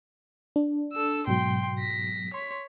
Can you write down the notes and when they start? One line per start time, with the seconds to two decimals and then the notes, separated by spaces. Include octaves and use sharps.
0.56 D4
0.93 A4 E6
1.27 G#2 B2 F#3 G5 C6
1.80 A#6 B6
2.34 C#5 C6 B6